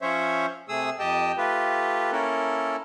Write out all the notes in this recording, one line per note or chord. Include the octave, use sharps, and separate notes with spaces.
F3 C#4 C5 C#5 E5
C3 A3 G#4 D#6 E6
F2 G4 D#5 G5 A5
A3 F4 G4 B4
A#3 C#4 E4 A4 A#4